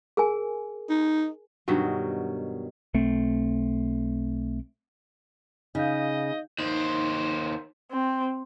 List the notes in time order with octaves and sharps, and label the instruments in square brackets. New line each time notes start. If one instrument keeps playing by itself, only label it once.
[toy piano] G#4 A#4 G#5
[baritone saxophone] D#4
[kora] G2 B2 D#3 F#3
[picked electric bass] B1 A3 C4
[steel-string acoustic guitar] C#3 [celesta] D#4 F5 G6 [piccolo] D#5
[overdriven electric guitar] D#2 C5 [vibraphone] D#4
[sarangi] C4